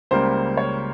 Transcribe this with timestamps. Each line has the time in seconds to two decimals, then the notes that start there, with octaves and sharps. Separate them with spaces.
0.11 C#2 C#3 G3 A#3 C5
0.57 C#5